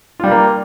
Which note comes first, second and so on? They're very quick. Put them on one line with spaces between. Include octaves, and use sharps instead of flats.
F4 G3 A#4 A#3